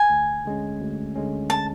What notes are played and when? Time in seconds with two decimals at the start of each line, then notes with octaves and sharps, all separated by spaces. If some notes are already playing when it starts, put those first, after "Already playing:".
Already playing: G#5
0.10 D2
0.45 D3 G#3 C#4
0.80 D2
1.15 D3 G#3 C#4
1.50 A5